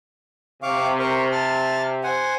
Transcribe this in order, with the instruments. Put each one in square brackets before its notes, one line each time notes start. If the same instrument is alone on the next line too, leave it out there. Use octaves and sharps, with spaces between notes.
[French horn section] C3 [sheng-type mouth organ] F5 C#6 D6
[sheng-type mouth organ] A#4 C5 C#6
A5 F6
C5 F#5 G#5